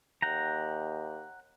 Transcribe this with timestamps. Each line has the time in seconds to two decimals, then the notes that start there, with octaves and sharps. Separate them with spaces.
0.22 D#2 F#5 G5 A#5